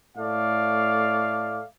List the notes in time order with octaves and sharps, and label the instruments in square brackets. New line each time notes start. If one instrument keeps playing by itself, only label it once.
[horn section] A2 A3 D5 F5